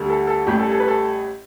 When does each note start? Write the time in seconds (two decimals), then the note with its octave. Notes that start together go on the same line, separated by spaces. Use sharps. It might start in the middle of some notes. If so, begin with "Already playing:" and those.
Already playing: D2 D3 G3
0.10 A4
0.27 A4
0.47 A1 A2 G3 G4
0.59 A4
0.72 A4
0.80 B4
0.88 A4